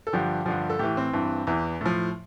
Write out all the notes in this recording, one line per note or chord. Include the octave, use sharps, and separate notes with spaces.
A4
G2 D3 F3 G4
G2 D3 F3
A4
A2 E3 G4
C4
G2 E3
E2 E3
A2 F3